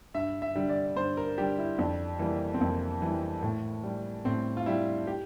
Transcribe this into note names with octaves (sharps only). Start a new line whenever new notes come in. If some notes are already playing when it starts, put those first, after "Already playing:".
G2 E5
E5
D3 G3
D5
G2 C5
A#4
D3 G3 G4
E4
F2 D4
E3 G3 A#3
C4
F2 A#3
E3 G3
A2
G3
A2 C4
F4
G3 E4
G4